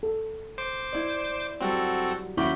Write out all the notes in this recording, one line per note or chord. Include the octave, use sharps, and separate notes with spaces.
A4
C5 D6
E4 D5
F#3 G3 C4 F#4 A4
D#2 F#3 C#4 E4 B5 C#6 D6 G6